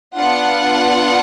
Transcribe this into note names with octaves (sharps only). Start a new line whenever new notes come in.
B3 D4 F4 F#5